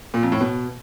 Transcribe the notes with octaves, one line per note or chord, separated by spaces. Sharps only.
A#2
F2
A2
B2